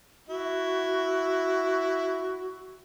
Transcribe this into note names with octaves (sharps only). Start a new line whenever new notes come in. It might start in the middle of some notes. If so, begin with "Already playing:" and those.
E4 F#4